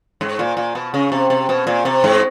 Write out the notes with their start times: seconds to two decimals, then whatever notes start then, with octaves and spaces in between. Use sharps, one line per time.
0.21 G#2
0.39 A#2
0.57 A#2
0.75 B2
0.94 C#3
1.12 C3
1.30 C3
1.49 B2
1.67 A#2
1.85 C3
2.04 G#2